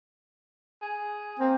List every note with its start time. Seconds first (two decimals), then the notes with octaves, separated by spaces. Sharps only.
0.82 G#4
1.39 A#3 C4